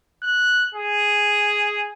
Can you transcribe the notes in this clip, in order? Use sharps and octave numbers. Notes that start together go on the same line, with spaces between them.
F#6
G#4